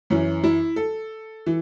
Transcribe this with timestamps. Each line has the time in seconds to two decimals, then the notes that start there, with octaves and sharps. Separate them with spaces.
0.10 F#2 E3 C#4
0.44 E4
0.76 A4
1.46 E3